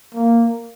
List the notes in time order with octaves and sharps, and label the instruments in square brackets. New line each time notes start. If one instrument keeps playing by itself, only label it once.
[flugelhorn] A#3